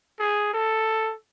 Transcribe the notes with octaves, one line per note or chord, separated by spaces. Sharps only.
G#4
A4